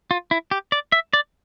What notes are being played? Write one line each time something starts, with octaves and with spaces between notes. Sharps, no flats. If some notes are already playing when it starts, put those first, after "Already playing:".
F4
E4
G4
D5
E5
D5